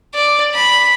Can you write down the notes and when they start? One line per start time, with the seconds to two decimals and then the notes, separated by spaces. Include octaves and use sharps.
0.15 D5
0.55 B5